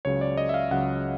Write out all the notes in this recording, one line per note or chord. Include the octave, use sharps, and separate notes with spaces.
C#2 C#3 F#3 C#5
D5
D#5
E5
F5
C#2 C#3 F#3 F#5